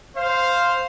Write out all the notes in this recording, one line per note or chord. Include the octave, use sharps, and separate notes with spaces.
C5 F5